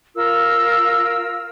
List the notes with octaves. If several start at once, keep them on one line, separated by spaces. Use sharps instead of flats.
F4 A#4 E6